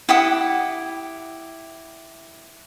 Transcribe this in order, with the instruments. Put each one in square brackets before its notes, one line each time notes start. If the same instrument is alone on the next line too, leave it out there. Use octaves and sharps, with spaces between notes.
[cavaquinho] E4 G4 F#5 D#6